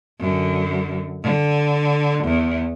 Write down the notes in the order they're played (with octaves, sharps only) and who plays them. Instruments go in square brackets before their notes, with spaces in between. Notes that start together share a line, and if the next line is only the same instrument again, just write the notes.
[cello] F#2 D3
D3
E2